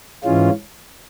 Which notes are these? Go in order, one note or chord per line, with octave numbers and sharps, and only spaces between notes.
G#2 E3 G#3 C#4 F4